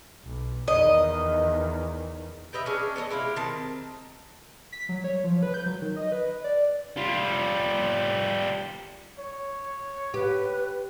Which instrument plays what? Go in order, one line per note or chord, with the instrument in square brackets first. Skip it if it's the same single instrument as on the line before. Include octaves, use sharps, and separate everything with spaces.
[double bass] B1
[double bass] E2 D#3 [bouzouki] D#5
[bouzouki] G4 B4 D#5 E5
C#4 D4 G#4 D#5
B3 A4 C#5 D#5
G#3 E4 G4 F5
D#3 C4 A5
[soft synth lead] B6
F#3
C#5
F3
B4
G6
F#3
D#3
D#5
B4
D5
[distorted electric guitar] G3 F4
[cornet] C#5
[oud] G4 [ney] B4